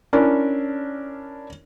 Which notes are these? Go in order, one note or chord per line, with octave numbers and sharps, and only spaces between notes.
C#4 D4 E4 A#4